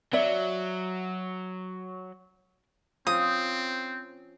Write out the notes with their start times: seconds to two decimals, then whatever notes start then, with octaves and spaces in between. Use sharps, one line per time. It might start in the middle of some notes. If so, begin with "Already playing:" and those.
0.13 F#3 C#5 D5 E5
3.07 F3 C4 C#4 D#6